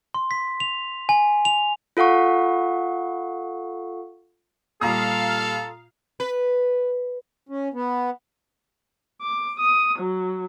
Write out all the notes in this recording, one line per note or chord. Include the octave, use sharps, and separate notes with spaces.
C6
B6
F7
G#5
F7
F4 A4 F5 F#5 C#6
A#2 G3 F4 A4 F5 A#5 D#6
B4
C#4
B3
D6
D#6
F#3